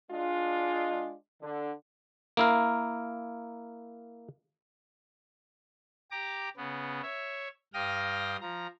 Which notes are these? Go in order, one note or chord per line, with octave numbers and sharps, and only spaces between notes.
G#3 D4 F4
D3
A#3 E4 A#4
G4 A#5 D6
C#3 B3
C#5 E5
G2 F5 G5 D#6 F6 A#6
F3 A#5